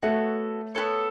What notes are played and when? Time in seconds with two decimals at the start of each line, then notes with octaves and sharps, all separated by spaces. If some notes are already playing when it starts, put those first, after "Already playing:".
0.02 A3 B3 F#4 A4 C#5
0.75 B3 F#4 A4 C#5